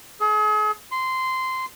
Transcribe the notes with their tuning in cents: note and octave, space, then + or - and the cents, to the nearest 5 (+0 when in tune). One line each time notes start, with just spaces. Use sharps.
G#4 +40
C6 -15